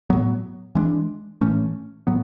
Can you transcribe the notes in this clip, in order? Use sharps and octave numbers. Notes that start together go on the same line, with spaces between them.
A2 F#3 B3
E3 G#3 B3 D4
A2 E3 A3 C#4
A2 F#3 B3